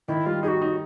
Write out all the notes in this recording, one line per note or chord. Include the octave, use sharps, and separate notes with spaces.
D#3 E4
G3 F4
D#4 G#4
F#4
D#4